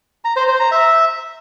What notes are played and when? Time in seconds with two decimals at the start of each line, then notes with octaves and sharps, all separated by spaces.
0.25 A#5
0.36 C5
0.48 C5
0.60 A#5
0.72 E5